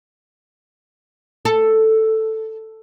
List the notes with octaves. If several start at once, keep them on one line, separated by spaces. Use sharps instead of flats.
A4